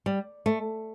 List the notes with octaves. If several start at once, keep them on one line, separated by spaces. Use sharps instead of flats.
G3
A3